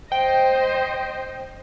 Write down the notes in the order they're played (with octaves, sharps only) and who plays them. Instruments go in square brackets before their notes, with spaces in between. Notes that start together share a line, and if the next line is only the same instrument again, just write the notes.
[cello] C5 D#5 [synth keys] G5